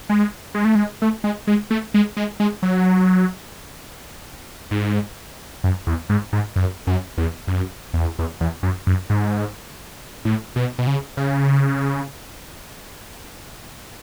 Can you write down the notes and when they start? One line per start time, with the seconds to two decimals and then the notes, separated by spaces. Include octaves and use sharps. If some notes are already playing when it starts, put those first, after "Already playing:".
0.10 G#3
0.55 G#3
0.65 A3
0.75 G#3
1.02 A3
1.24 G#3
1.47 G#3
1.70 A3
1.94 G#3
2.17 G#3
2.40 G#3
2.63 F#3
4.71 G#2
5.64 F#2
5.87 E2
6.10 G#2
6.33 G#2
6.56 F#2
6.87 F#2
7.17 E2
7.48 F#2
7.94 E2
8.19 E2
8.41 E2
8.63 F#2
8.87 F#2
9.10 G#2
10.25 A2
10.56 B2
10.79 B2
10.87 C#3
11.17 C#3